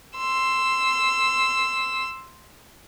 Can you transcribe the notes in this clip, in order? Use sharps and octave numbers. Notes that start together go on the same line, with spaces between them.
C6 E6